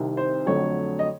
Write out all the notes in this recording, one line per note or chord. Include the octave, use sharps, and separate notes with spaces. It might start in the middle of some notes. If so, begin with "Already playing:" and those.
Already playing: C2 C3 D#3
C5
F2 D3 F#3 A3 C#5
D#5